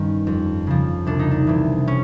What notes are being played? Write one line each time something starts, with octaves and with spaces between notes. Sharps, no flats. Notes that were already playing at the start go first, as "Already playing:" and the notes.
Already playing: G2 D#3 C#4
F2
C#3 F3
C2 D4
D#4
D4
C3 E3
C#4